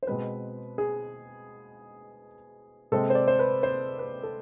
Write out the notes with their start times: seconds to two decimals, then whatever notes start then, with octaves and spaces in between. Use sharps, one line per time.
0.03 C5
0.07 B2 G#3 C4 B4
0.78 G#4
2.92 C3 G#3 C4 A4
3.10 C5
3.15 D5
3.28 C5
3.39 B4
3.63 C5
3.99 B4
4.23 A4